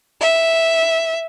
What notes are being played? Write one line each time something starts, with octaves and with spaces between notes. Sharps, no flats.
E5